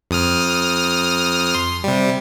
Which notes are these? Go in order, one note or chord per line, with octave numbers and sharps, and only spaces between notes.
F2 D#6 F6
C6
C3 G3